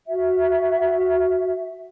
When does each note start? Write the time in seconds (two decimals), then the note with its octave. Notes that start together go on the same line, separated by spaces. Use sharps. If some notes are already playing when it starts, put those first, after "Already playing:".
0.06 F#4 E5